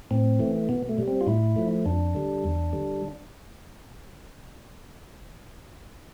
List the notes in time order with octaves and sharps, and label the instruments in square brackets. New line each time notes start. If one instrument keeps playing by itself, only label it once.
[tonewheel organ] A2 C4
E3 A3
B2 B3
A3
G3
C4
F4
A2 E4
F3 A3
F2 D4
D3 G3
E2
D3 G3